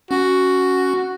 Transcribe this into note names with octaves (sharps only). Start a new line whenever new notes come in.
C#4 F#4